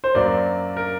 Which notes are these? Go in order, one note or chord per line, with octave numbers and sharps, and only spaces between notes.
C5
F#2 F#3 A#3 D5
A#4